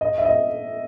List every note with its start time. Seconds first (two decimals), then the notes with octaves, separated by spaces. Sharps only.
0.01 D#5
0.18 E5
0.25 D#5